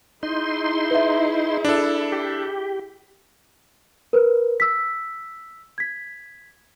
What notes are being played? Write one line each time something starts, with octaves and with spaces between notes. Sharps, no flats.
D#4 E4 G#4 C6
B4 E5
D4 A4
G4
A#4 B4
E6 B6
G#6 B6